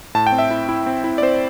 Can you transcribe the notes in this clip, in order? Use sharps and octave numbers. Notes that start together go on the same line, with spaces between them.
A2 A5
G5
C4
E5
E4
E4
C4
E4
D5
C4 C5